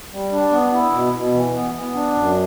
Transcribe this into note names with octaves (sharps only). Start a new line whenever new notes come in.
G3
D4
B3
E4
B2
B2
E3
B3
B3
D4
F#2